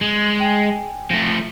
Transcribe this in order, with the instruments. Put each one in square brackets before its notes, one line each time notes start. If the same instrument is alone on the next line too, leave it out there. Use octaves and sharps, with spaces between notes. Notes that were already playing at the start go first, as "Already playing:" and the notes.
[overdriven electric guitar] G#3
[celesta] G5 G#5
[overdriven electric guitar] F3 A3 [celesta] A#6